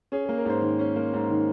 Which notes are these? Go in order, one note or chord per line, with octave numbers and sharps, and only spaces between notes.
C#4 G#4
A#3 G#4
A#4
G#2 C5
D#3
C#4
A#3
G#2
D#3